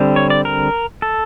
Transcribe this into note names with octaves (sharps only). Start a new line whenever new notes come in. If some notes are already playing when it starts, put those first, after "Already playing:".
Already playing: D3 G3 C4
C#5
D5
A#4
A4